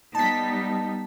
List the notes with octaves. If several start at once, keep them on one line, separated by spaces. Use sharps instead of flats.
G3 B3 D#4 A5 B6